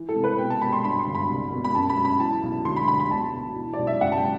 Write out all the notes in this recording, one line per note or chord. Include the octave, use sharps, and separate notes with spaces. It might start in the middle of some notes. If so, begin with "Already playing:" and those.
Already playing: E3
A4
C3
B4
B2 G5
A5
B2 B5
C6
G2 B5
C6
G1
B5
C2
B2
B5
F#2 A5
B5
F#2
B5
E3 A5
B1
D2 C6
B5
D2 B5
B5
B2 A5
B2
E3
D5
B1
E5
F#1 F#5
A5
G5